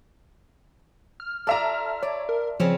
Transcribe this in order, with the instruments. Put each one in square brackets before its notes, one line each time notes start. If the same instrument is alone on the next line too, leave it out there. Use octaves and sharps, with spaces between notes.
[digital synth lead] F6
[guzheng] F4 D5 [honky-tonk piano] A4 E5 A#5
[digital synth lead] C#5 [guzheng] D5
[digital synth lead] A#4
[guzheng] C#3 C4 C#4 [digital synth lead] F3